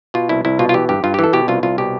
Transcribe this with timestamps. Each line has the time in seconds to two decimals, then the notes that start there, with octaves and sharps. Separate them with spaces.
0.14 B2 F4
0.29 C2 E4
0.45 C2 E4
0.59 B2 F4
0.69 F4
0.74 E3 G4
0.89 G2 G4
1.04 G2 F4
1.14 G4
1.19 E3 A4
1.33 B2 G4
1.48 C2 F4
1.63 C2 F4
1.78 B2 G4